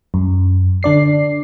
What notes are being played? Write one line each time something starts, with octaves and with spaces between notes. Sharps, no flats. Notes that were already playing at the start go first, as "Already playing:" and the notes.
F#2
D3 D4 D5 C7